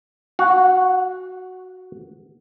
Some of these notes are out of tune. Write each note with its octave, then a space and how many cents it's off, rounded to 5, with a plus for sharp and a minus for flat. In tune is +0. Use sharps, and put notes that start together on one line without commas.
F#4 +0 F5 +45